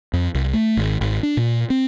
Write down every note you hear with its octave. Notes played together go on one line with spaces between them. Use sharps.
F2
C2
A3
G#1
G#1
D4
A#2
C4